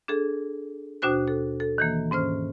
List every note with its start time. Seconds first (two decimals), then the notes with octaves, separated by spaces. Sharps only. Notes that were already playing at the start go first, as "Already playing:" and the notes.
0.08 D4 G#4 A4
1.02 D#2 B2 D4 F#4 C5 F#6
1.28 A4
1.60 A4
1.78 D#3 E3 A#3
2.11 G#2 C#4 C5 F6